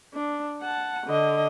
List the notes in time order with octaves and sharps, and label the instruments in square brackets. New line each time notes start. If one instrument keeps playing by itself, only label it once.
[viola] D4
F#5 A5
D3 D#5